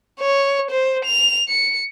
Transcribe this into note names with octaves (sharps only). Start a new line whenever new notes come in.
C#5
C5
F7
C#7